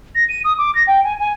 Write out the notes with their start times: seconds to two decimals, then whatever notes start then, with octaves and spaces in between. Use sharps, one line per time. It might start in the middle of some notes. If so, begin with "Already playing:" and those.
0.15 A#6
0.29 D#7
0.44 D#6
0.58 D6
0.75 A#6
0.87 G5
1.03 G#5
1.19 G#5